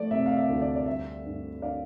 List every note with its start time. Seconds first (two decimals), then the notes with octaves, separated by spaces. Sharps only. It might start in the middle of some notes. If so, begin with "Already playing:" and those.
Already playing: F3 A3 D5
0.11 C3 E5
0.26 F5
0.37 E5
0.49 D2
0.62 D5
0.76 D5
0.86 G3 E5
1.25 G2
1.62 D3 D5 F5